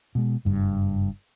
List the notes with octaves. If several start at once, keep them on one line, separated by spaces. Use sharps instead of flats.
B2 G#3
F#1 G2